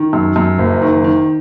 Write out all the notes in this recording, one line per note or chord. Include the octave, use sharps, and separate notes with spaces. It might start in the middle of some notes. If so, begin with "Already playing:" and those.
Already playing: D#3
F#2
F#2
F#1
D#3
D#3